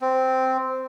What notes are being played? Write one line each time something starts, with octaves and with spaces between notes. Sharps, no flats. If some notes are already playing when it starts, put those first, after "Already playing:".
C4